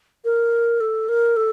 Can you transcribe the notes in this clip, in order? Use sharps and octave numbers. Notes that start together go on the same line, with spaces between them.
A#4
A4
A#4
A4